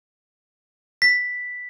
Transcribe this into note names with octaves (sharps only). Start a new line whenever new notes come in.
B6